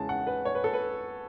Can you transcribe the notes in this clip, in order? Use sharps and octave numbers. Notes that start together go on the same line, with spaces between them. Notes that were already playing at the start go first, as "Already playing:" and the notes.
Already playing: E2 C#3 G#3 C#4 A5
F#5
B4
C#5
B4
A4
B4